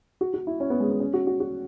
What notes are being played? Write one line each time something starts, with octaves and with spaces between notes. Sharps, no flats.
F#4
F#4
E4
C#4
B3
G#3
B3
C#4
F#4
F#4
F#4